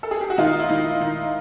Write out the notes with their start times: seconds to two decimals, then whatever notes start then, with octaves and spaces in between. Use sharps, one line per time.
0.03 A4
0.11 G#4
0.21 G4
0.30 F#4
0.38 D#3 D#4 F4
0.59 E4
0.69 D#3 D#4
1.00 D#3 D#4